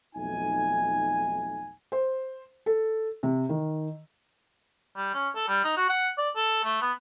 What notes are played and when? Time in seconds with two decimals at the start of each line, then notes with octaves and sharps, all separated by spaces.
0.16 B1 F2 A3 D#4 G#5
1.92 C5
2.66 A4
3.23 C3
3.49 D#3
4.96 G3
5.14 C#4
5.36 A4
5.48 G3
5.64 D#4
5.77 F#4
5.89 F#5
6.18 D5
6.36 A4
6.64 A3
6.82 B3